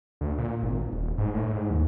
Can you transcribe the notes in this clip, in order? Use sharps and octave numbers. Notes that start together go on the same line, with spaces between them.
D2
A#2
G#1
D#1
G#2
A2
G#2
D#2